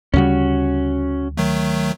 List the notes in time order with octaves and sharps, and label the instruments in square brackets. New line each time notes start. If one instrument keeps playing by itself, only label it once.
[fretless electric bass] D2 C#3 G3 [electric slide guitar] C#4 F#4
[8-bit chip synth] D#3 F#3 A3